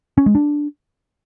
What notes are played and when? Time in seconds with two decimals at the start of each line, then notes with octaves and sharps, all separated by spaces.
0.18 C#4
0.26 G#3
0.35 D4